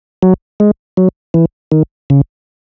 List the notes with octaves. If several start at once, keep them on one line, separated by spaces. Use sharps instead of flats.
F#3
G#3
F#3
E3
D#3
C#3